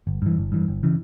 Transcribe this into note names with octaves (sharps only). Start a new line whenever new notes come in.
G1
G2 E3
G1
G2 E3
G1
C#3 E3